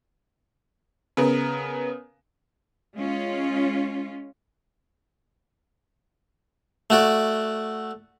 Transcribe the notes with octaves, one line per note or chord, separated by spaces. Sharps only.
C#3 B3 A#4
G#3 C#4 F4
A3 F#4 D5